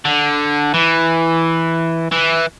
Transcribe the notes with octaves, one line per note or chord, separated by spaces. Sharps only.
D3
E3
E3